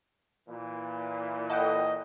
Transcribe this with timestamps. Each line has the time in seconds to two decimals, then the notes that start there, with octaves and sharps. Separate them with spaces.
0.48 A#2 E3
1.50 A4 D#5 F#5 G5